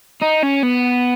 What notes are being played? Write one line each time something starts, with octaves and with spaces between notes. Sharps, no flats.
D#4
C#4
B3